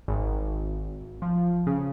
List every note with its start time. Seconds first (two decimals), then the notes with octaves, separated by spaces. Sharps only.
0.08 G#1
1.22 F3
1.67 C#3